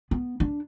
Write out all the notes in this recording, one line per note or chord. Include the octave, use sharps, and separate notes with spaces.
B3
D4